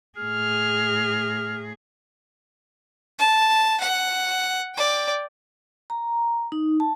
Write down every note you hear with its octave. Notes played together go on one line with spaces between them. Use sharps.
A2 G#4 F6
A5
F#5
D5 G5
A#5
D#4
A5